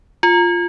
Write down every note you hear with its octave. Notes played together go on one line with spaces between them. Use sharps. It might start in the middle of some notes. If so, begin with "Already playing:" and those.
F4